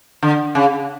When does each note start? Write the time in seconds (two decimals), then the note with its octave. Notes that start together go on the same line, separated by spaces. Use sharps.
0.22 D3
0.55 C#3